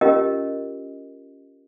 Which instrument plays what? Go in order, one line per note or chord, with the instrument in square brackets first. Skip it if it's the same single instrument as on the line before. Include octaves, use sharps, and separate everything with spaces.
[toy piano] C#4 F4 G4 A#4 D#5